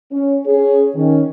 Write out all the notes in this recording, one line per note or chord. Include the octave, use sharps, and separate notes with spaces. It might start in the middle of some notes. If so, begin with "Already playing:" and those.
C#4
C#4 G#4
D#3 C#4